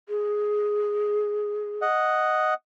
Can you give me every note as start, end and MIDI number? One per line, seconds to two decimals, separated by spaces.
0.09 1.83 68
1.82 2.54 75
1.82 2.54 78